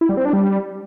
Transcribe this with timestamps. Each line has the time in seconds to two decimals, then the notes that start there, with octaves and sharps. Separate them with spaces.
0.01 E4
0.09 G3
0.17 C4
0.25 D4
0.33 G3